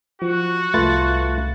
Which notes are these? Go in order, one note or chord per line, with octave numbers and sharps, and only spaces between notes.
F3 F#4
C2 A3 F4 B4 A6